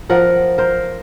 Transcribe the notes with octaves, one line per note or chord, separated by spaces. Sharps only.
F3 A#4 F#5
A#4 C5